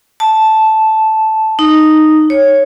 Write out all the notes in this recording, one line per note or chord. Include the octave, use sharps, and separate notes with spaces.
A5
D#4
C#5